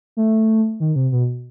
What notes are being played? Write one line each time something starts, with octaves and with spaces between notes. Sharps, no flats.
A3
D#3
C3
B2